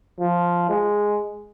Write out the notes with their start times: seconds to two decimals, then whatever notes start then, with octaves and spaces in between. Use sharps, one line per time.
0.20 F3
0.70 G#3